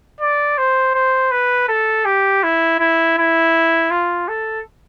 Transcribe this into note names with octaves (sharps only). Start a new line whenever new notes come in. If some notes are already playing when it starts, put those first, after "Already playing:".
D5
C5
C5
B4
A4
G4
E4
E4
E4
F4
A4